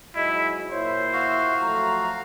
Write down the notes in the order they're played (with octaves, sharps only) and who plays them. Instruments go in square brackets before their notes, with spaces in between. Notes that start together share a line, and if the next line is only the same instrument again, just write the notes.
[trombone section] G#2 F#3 G#3 [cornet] E4 [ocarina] D#5
[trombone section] A#2 E4 [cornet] C5 [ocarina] C#5
[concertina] F#4 F5 [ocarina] E5
[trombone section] F3 F#3 A3 [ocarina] A#5